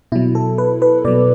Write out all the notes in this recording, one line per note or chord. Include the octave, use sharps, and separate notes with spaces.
B2 F#3 E4
A4
B4
B4
B2 F#3 D5